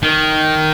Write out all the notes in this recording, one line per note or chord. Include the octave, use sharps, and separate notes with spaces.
D#3